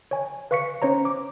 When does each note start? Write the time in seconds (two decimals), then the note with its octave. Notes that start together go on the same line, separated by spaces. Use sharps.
0.11 C#5 G#5
0.51 B4 F5 C#6 B6 C#7
0.82 C#4 C5 C#5 A#5
1.05 D6